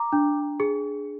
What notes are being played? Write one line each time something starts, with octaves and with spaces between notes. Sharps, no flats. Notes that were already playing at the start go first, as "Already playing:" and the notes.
Already playing: A#5 D6
D4
G#4